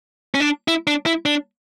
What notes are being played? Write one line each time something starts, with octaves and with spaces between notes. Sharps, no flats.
C#4
D4
E4
D4
E4
D4